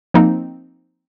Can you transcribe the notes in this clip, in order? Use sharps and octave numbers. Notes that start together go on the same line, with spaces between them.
F3 A#3 C4 D#4